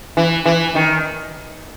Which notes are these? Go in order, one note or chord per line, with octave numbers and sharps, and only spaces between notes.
E3
E3
D#3